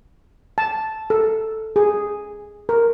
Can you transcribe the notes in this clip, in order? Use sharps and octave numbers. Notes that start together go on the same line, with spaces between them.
A5
A4
G#4
A#4